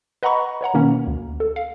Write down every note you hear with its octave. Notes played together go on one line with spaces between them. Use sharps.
B4 D#5 F#5 A#5 B5 C#6
B4 C#5 F#5 A#5
B2 D#3 A#3 C#4
D2
A4
F5